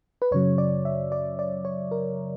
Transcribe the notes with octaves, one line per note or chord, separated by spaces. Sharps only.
B4
F#2 C#3 F#3 C#5
D5
E5
D5
D5
C#5
A#4